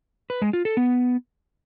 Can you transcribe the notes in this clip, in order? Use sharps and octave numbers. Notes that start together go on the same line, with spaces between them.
B4
G#3
F4
A4
B3